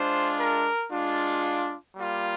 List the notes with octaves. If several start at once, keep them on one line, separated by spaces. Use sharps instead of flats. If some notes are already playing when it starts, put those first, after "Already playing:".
Already playing: G#3 D4 F4 C5
A#4
G#3 D4 F4
G3 A#3 F4